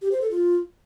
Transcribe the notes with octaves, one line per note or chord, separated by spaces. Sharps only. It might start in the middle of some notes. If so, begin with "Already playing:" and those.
G4
C5
A4
F4